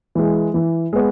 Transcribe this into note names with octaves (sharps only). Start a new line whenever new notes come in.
E3 G#3
E3
G#3 B3